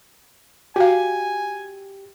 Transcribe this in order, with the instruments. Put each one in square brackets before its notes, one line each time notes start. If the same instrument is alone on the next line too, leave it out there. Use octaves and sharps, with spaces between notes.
[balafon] F#4 F5 [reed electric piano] G4 [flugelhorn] G#5